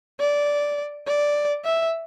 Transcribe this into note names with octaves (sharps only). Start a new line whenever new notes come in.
D5
D5
E5